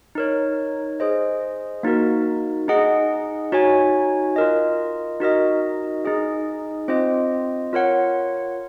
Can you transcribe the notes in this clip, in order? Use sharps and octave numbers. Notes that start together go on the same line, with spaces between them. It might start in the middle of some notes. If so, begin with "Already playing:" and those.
D#4 A#4 C#5
G#4 C5 D#5
A#3 D#4 F#4 A#4
D#4 G#4 D#5 F#5
D#4 F#4 C#5 G#5
F4 A#4 D#5
D#4 F#4 A#4 D#5
D#4 G#4 D#5
C4 F4 C5 D#5
F4 A#4 C#5 F#5